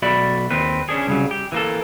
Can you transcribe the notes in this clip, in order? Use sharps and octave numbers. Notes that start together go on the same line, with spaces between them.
B1 F#4 D5 E5 B5
D#2 C4 B4
C#4 D4 G#4
C2 C#3 F#3
G4
E3 A#3 A4